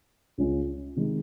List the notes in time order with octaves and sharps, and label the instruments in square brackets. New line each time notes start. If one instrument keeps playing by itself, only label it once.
[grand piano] C#2 C#3 G#3 C#4 F4
C3 D#3 G#3